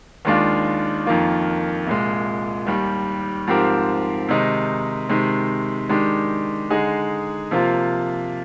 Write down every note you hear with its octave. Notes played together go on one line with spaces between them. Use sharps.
D#2 D#3 G#3 D4 F4
F2 D#3 A#3 F4
C2 A#2 G#3
D#2 D#3 G3
G#2 F3 C4 G4 A#4
C3 D#3 G#3 D#4
C3 D#3 G#3
D#3 G#3 D4 G4
D3 G#3 D#4 G#4
C3 F3 A#3 F4